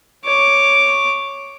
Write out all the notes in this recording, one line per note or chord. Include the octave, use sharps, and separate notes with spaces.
C#5 D6